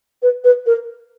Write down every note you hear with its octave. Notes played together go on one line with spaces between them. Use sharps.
B4
B4
A#4